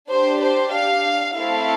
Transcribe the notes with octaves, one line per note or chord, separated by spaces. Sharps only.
D4 G4 C5
C5
F5
A3 C4 E4 A4 F5